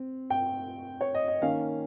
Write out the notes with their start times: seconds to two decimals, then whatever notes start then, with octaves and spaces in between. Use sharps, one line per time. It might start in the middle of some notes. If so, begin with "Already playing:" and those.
Already playing: C4
0.30 G5
1.01 C#5
1.14 D#5
1.28 D#5
1.42 D#3 A#3 C#4 F5